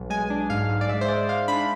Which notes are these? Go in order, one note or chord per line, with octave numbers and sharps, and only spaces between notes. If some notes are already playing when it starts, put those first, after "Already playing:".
Already playing: B1
G#3 G#5
D4
G#2 F5
G#2
D5
G#3 E5
C5
G#3 D5
G#3 F5
D4 B5